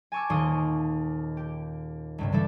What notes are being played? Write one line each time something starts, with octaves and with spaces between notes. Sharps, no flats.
G#5 A5 C#6 D6 E6
D#1 D#2 C6 C#6 D#6
G4
C#2 G2 C3
E3 G3 D4 A4